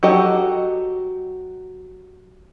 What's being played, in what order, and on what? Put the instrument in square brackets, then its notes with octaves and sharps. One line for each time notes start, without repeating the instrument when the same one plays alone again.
[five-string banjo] F#3 F#4 G4 A4 D#5